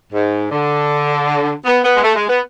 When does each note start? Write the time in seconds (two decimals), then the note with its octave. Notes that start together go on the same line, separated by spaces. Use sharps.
0.13 G#2
0.51 D3
1.65 B3
1.84 B3
1.96 G#3
2.04 A3
2.16 G#3
2.29 B3